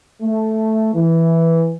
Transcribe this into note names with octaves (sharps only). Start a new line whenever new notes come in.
A3
E3